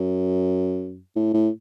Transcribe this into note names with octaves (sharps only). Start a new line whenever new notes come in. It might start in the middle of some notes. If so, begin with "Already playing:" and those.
Already playing: F#2
A2
A2